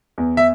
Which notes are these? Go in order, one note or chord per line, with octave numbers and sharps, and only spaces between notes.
E2
E5